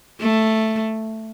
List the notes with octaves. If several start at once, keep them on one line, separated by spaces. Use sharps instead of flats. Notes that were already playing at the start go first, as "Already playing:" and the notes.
A3